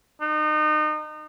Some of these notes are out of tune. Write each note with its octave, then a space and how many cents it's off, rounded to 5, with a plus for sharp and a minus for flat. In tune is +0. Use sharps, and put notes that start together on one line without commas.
D#4 -30